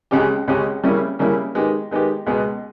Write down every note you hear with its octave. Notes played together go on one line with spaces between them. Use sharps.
C#2 C#3 G#3 C#4 G4
C#2 C#3 G#3 C#4 G4
C#3 G3 A#3 C#4 E4
C#3 G3 A#3 C#4 E4
D#3 G#3 B3 G4
D#3 G#3 B3 G4
C#2 B2 G#3 B3